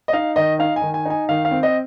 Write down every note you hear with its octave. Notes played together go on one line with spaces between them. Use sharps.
D#5
D#4 F5
D#3 D#5
D#4 F5
G#5
D#3
G#5
D#4 G#5
D#3 F5
F5
C4
D#5